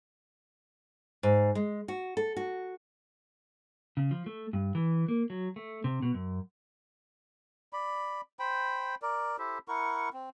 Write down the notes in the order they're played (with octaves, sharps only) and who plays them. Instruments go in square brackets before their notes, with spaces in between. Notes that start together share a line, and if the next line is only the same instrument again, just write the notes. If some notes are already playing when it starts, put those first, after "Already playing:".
[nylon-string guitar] G#2
G#3
F#4
A4
F#4
[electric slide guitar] C#3
F3
A3
G2
E3
A#3
F#3
A3
C3
B2
F#2
[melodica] D5 B5
C5 G5 B5
A#4 D5
E4 G4 A4 C5
E4 A#4 F#5 C#6
C4